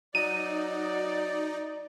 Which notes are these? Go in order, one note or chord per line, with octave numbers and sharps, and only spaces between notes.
F#3 D#4 D5 D#7